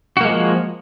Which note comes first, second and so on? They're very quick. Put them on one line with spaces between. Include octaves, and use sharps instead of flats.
F#4 A#3 G#3 F3